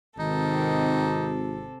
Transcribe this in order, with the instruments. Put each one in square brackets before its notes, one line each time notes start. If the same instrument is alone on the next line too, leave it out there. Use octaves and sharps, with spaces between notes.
[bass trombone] G#1 [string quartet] C3 A4 [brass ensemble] D#3 [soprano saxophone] D#4